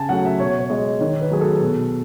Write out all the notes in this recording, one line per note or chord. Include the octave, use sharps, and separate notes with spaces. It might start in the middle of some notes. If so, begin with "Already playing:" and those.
Already playing: C#3 G#5 A5
F#3 A3 F#5
E5
B2 C#5
C#5
G#3 D#5
D#3 C#5
B4
F#3 A3 G#4
A4
B2